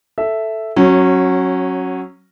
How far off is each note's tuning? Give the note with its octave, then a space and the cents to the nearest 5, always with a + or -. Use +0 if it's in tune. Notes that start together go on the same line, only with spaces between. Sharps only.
A4 +0 E5 +0
F#3 +0 C#4 -20